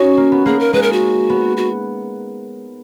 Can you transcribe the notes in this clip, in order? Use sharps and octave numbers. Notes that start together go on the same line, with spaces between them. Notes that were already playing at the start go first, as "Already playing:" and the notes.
Already playing: C#4 D#4 F#4
A#3
B3
A#3 G#4
A#4
G#3 B4
A#4
F#4
B3
F#4